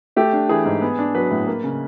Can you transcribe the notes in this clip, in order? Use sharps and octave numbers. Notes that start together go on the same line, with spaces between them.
A3 G4
D4
E3 G#4
G#2
B3
D4
F#3 B4
A2
A#3
C#3